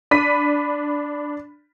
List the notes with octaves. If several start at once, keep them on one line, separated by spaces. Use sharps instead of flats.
D4 B5 B6 D#7